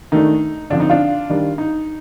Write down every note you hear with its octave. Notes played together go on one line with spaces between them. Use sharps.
D#3 A3 D4 D#4
D3 F3 C4 D4
D#4
D4 F4
D#3 G3 D4
D#4